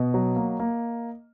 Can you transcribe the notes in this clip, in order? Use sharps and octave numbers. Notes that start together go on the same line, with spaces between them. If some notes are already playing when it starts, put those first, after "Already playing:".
Already playing: B2 D#5
F#3
A#3
A#3